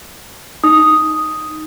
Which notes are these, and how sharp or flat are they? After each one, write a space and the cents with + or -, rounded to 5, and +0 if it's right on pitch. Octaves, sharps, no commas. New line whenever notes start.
D#4 +0 D#6 +0